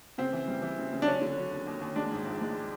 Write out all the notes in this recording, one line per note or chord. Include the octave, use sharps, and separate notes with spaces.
C#3 C4
E3
G3
E3
C#3
C#3
D4
F#3 C#4
D3
F#3
D#2
D#2
D#2
G#3 D4
G#2
A#1
G#3